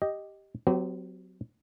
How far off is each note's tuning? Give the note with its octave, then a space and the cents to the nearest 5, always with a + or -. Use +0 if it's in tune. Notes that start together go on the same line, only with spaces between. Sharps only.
G4 +0 D#5 +0
F#3 +0 C4 -45 G4 -15